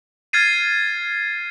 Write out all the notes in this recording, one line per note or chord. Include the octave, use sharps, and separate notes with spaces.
F6 G#6 A6 C7 D#7